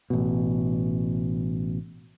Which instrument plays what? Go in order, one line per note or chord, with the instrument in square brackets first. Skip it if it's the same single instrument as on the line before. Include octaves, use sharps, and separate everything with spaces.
[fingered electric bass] A1 B2